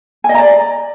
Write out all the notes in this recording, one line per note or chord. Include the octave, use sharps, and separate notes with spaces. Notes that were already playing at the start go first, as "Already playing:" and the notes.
G#5
D#5
A#5
D5